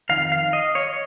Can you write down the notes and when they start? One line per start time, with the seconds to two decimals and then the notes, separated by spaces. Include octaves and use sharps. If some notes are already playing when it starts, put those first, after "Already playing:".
0.09 F2 D#3 F5
0.32 F5
0.53 D#5
0.75 C#5